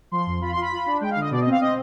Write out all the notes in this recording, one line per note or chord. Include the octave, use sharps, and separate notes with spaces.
F3 C6
F2
F4 B5
C6
F4
B5
F4
D4
G#3 G5
F5
D3 D#5
B2 D5
D#5
C4 F5
C4 D#5